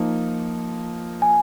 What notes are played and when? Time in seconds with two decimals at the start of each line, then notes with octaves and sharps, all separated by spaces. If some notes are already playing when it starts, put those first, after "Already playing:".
Already playing: F3 A#3 D#4
1.22 G#5